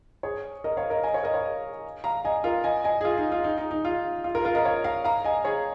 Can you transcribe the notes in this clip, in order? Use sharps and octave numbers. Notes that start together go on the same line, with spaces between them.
G#4 C#5
A#4 D#5
C#5 F5
A#4 D#5
D#5 G#5
C#5 F5
A#4 D#5
C#5 F5
F5 A#5
D#5 G#5
F4 A#4
D#5 G#5
D#5 G#5
G#4
F4
D#4
F4
D#4
D#4
D#4
F4
F4
F4 A#4
F4 A#4
A#4 D#5
C#5 F5
F5 A#5
F5 A#5
D#5 G#5
G#4 C#5